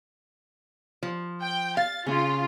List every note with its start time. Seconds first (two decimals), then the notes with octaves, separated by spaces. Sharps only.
1.03 F3
1.42 G5
1.77 F5 A6
2.06 C#3 C#4 F4